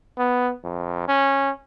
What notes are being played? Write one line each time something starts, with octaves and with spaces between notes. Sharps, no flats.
B3
F2
C#4